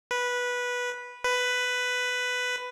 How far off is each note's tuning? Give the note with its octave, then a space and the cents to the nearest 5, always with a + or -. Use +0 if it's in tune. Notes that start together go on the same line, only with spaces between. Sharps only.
B4 -10
B4 +10